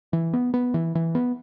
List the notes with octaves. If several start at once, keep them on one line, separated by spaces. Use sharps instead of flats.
E3
B3
B3
E3
E3
B3